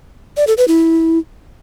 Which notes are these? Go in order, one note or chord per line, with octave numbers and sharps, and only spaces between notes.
D5
A4
B4
E4